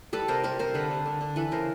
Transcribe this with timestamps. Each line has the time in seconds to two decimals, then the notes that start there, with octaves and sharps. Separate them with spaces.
0.13 G3 A4 B4
0.28 C3 A#4 C5
0.43 G3 A#4 C5
0.59 C3 A#4 C5
0.74 D3 A4 B4
0.91 D3
1.06 D3
1.21 D3
1.36 E3 A4 B4
1.51 C#3 A#4 C5